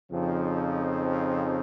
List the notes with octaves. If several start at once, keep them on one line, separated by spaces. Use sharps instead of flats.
F2 C#3 F3 C4 D#4